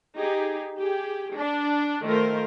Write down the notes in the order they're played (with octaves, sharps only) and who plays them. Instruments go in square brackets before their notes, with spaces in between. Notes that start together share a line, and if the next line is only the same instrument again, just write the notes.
[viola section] D#4 G4 G#4
G4 G#4
D4
D#3 A3 F4 A#4 C5